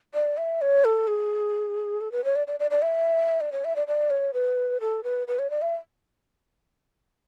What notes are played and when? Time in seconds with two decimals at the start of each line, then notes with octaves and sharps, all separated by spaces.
0.14 D5
0.37 E5
0.61 C#5
0.85 A4
1.07 G#4
2.01 A4
2.12 B4
2.25 C#5
2.36 D5
2.47 D5
2.60 D5
2.71 D5
2.82 E5
3.41 D5
3.52 C#5
3.65 E5
3.76 D5
3.87 D5
4.10 C#5
4.34 B4
4.81 A4
5.04 B4
5.28 B4
5.39 C#5
5.50 D5
5.62 E5